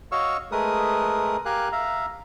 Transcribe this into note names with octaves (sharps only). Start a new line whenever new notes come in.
F#4 C#5 D#5 F5 C#6 E6
G#3 A3 G#4 A#4 B4 D#6
G4 A#4 F5 G#5 F#6
E5 F5 A#5